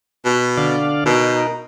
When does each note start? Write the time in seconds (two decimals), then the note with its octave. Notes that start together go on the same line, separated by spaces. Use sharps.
0.25 B2
0.57 D3 D5 F5
1.06 B2 D#4 A#4